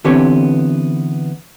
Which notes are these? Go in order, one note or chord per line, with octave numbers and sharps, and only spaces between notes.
D3 E3 B3 C4 G4 C#5